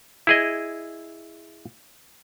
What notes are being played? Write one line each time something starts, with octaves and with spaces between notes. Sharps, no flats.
E4 G#4 D#5